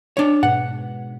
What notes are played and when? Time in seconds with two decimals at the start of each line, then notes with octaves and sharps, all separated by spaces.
0.17 D4 C#5
0.43 G#2 B2 F#5